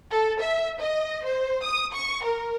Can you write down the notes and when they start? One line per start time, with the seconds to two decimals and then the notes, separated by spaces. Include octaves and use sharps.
0.10 A4
0.40 E5
0.79 D#5
1.24 C5
1.63 D#6
1.92 C#6
2.24 A#4